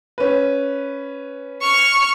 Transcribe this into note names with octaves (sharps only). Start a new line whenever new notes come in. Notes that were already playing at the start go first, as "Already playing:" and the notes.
C#4 B4
C#6 F6